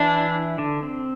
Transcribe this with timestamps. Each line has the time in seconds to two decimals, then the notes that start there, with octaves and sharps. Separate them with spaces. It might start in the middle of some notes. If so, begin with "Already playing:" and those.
Already playing: E3 D4 E4
0.58 D3 D4
0.83 C4